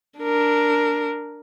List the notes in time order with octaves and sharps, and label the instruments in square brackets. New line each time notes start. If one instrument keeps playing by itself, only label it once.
[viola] D4 A#4